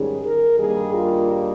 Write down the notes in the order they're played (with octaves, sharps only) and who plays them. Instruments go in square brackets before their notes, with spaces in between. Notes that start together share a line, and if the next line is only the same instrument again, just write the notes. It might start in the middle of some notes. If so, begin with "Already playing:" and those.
Already playing: [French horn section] G#2 D#3 G3 C#4 G#4
A#4
G2 D#3 G3 A#3 D#4 G#4
F4